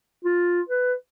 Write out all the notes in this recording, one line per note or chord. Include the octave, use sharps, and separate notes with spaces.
F4
B4